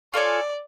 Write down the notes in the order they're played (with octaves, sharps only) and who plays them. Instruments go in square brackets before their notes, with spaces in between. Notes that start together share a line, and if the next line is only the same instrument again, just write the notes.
[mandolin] F4 A4 C#5 G#5 [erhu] D5